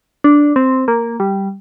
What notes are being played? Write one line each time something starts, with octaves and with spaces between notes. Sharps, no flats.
D4
C4
A#3
G3